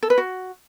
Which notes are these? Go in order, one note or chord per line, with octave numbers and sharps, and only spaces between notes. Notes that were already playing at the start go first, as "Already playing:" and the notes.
A4
B4
F#4